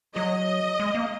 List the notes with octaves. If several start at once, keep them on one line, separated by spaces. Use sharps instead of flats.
F#3 D#5
G#3
A#3